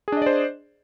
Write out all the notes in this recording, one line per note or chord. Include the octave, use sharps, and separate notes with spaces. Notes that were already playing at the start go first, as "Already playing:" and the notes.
D4 G#4 C5 D5 D#5